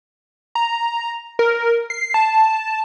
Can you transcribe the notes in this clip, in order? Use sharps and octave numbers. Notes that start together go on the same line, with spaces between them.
A#5
A#4
C7
A5